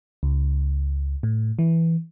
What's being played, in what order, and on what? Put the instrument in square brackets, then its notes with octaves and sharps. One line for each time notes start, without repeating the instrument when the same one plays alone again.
[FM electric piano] C#2
A2
E3